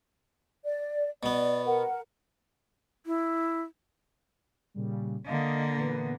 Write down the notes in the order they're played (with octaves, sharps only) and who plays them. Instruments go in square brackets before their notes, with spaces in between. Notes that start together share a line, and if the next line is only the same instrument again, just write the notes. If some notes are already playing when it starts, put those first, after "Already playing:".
[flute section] D5
[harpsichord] B2 B3 [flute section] D5
[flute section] A#4 F#5
[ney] E4
[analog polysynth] A#2 C#3 G3
[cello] D3 A#3 [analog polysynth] D#5 F5
[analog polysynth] A#2 E3 B3